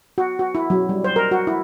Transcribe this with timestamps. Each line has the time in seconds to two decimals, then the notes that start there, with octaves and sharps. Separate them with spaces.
0.18 F#4
0.39 F#4
0.55 E4
0.70 F#3
0.89 G3
1.04 C5
1.16 A#4
1.31 F#4
1.47 E4